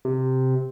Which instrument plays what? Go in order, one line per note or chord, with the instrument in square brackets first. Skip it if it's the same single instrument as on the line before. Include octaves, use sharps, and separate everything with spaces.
[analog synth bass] C3